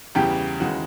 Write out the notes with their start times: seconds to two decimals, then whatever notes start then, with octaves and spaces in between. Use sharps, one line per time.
0.15 E2 C#3 E3 G3 G4 G5
0.60 D#2 C#3 E3 G#3 F#4 F#5